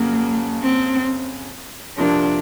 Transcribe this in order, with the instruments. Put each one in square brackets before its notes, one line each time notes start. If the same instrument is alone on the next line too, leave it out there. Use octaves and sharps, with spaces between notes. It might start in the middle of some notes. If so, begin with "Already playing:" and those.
Already playing: [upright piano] F2 C#3 F#3 [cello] A#3
[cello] C4
[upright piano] F2 C3 F3 A#3 [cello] D4